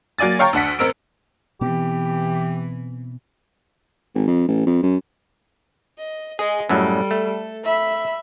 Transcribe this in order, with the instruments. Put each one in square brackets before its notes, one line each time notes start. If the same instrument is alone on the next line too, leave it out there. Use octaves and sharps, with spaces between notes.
[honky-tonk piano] F#3 A#3 D5 G#5 A6
C#5 F5 G5 A#5 C#6
D2 D4 F#5 B6
A1 C4 A#4 E6 D7
[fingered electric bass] B2 B3 C4 [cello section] E3 [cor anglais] G4
[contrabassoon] G#1
F2
A1
F2
F#2
[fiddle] D#5
[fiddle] G#3 D#5 [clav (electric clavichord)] G#4
[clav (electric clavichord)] F#2 A2 F#3 [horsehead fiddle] G3 [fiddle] A4
[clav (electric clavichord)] A3
[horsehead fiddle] E5 [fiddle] B5